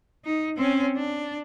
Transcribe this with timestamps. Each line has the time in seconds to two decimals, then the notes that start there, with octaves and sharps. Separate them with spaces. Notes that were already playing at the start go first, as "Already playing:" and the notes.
0.25 D#4
0.57 C4 C#4
0.96 D4